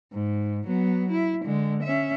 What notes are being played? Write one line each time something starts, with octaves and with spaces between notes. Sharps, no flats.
G#2
F#3 B3
E4
D3 G#3
C#4 E5